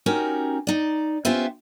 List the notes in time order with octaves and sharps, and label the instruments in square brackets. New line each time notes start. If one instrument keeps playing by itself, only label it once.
[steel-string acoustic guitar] C#4 D#4 F#4 G4 A#4
D#4 D5
B3 C#4 F4 G4 C5 E5